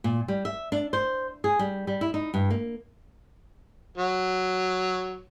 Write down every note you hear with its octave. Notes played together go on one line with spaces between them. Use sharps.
A#2
G3
E5
D4
C5
G#4
G3
G3
E4
D#4
G2
A#3
F#3